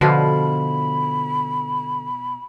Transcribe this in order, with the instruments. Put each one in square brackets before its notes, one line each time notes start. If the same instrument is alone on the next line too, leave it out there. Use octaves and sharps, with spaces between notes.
[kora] B2 F3 F4 [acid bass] D3 [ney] B5